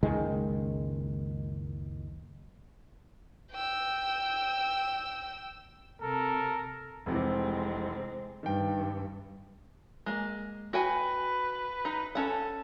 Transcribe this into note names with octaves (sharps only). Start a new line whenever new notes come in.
F#1 C#2 D#3 G#3
G5 E6
C3 A4 A#4
F1 C3 E3 G#3 C4
G2 D#3 G5
G#3 A#3
F#4 B4 G5 G#5
D#4
C#4 A4 F#5